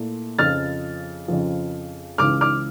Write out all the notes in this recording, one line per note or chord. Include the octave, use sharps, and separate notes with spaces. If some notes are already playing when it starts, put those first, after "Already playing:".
Already playing: A#2 A3 E4
F2 C#3 F3 F6 A6
F2 C#3 F3
C#2 C#3 E3 D6 F6
D6 F6